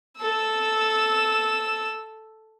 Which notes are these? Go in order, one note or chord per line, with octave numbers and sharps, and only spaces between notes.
A4 E6